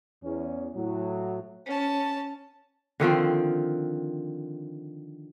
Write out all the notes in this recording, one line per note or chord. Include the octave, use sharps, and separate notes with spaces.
E2 C#4
A2 F#3
C#4 A5
D3 D#3 F3 C4